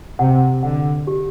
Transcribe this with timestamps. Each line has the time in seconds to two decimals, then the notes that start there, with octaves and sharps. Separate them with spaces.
0.19 C3 F#5
0.63 D3 F#5
1.07 G4